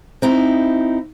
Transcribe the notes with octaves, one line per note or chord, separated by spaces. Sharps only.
C4 D#4 E4